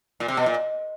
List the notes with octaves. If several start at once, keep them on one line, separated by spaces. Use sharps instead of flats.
A#2
C3
B2
A#2